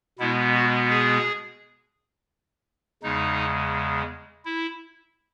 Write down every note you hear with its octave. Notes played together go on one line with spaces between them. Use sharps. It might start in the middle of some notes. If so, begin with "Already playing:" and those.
B2 G#3 B3 E4
F#4
G#4
E2 C#3 G#3 D#4
E4